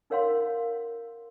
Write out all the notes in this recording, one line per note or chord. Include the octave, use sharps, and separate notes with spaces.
D#4 A#4 C#5 F5 F#5 C6